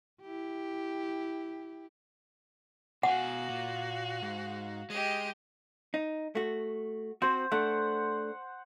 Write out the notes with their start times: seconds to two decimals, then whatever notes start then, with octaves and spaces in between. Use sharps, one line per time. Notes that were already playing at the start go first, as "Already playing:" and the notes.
0.22 E4 G4
3.03 B2 F#4 F5 F#5 G#5
3.49 A#2
4.22 G#2
4.90 G#3 G4 D#5
5.94 D#4
6.35 A3 F#4
7.22 C4 F#4 C5
7.52 A3 D4 F#5